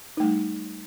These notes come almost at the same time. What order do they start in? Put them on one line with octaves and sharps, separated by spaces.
D#4 A3 G3